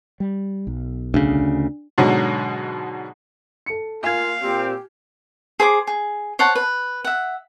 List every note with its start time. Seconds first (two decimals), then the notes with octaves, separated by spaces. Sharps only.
0.20 G3
0.67 B1
1.14 D2 C#3 D4
1.98 G#2 B2 D3 F#3 G#3
3.66 A4 C#7
4.03 A#3 F4 F5 G#5 G#6
4.41 A#2 C4 G4
5.60 G#4 C5 B5 D6
5.87 G#4
6.39 C5 C#5 F#5 A5
6.55 B4
7.04 E5 F#5